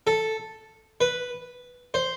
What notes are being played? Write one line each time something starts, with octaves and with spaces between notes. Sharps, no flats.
A4
B4
C5